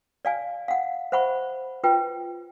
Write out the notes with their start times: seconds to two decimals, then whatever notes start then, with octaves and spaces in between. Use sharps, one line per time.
0.25 D5 F5 G#5
0.68 F5 F#5
1.12 C5 E5 F#5 B5 C#6
1.84 F4 B4 G5